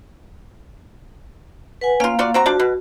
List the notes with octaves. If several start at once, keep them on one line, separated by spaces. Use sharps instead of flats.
B4 F#5 G#5
A#3 C#4 F4 F5
F4 F#4 D5
C4 F#4 A#5
F3 D4 F#4 D5
B2